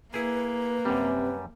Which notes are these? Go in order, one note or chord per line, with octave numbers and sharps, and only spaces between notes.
A#3 E4 G#4 B4
F#2 C3 G3